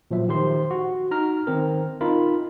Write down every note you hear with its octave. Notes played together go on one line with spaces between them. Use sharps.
A#2 F3 F#3 E5
D#3 G4 C5 C6
F#4
D#4 A#5 F6
D#3 C4 A#4
D#4 F4 A#4 B5